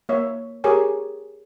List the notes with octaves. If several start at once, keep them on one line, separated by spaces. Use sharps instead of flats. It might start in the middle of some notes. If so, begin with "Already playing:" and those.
A#3 C#5 E5
G4 G#4 A#4 C#5 G#5